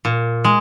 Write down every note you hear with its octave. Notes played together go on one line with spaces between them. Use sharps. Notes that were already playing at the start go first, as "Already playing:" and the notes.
A#2
G#3